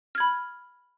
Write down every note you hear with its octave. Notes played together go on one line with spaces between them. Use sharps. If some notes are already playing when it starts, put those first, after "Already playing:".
B5 F6 G#6